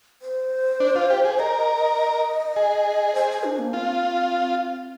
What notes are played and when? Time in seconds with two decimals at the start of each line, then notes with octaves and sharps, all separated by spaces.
0.22 C5
0.80 D4
0.95 F4
1.10 G4
1.25 G#4
1.39 A#4 D#5
2.56 G#4
3.15 C5
3.30 C5
3.44 D4
3.59 A#3
3.73 C4 F4